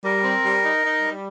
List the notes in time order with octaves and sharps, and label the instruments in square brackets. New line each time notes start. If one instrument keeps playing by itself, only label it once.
[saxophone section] G3 [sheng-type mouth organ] A#4
[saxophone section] C4
G3
D#4
D#4
G3